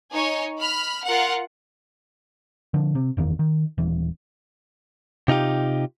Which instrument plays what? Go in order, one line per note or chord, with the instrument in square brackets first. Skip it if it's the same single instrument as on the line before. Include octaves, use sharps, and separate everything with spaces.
[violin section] D#4 C#5 G#5
B5 F6
F4 A#4 F#5
[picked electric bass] D3 F3
C3
F#1 E2 D#3
D#3
D#1 E3
[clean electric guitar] C3 D#4 F4 G4